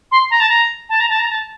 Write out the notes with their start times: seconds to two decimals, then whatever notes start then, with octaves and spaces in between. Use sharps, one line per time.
0.12 C6
0.31 A#5
0.40 A5
0.49 A#5
0.89 A5
1.00 A#5
1.09 A5
1.19 A#5
1.30 A5